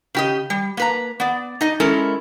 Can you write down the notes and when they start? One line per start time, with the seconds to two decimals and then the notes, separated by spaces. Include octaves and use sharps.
0.15 C#3 G4 D#5
0.50 G3
0.77 A#3 B4 A#5
1.20 B3 D5
1.61 D#4 D#5
1.80 G#3 C#4 E4 A4 A#4